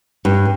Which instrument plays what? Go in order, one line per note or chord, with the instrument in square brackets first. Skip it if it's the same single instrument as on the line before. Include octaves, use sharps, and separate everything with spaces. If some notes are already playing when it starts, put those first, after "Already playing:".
[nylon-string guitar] G2